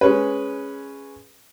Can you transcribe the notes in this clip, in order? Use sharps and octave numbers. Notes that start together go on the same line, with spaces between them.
G#3 C#4 B4